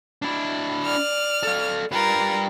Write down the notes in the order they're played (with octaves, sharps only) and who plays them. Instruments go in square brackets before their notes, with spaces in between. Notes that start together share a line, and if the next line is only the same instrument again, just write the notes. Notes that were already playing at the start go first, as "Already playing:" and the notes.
[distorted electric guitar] D4 E4
[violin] D5 F6
[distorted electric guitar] A4 F5
[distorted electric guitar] G3 B4 [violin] F4 A#4